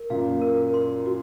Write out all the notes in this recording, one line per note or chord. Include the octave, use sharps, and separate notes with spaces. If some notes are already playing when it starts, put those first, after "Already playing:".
Already playing: A#4
F#2 A#2 F5
A#4
C6
F#4